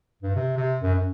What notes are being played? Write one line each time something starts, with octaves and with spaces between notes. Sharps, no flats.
G2
C3
C3
F#2
F#2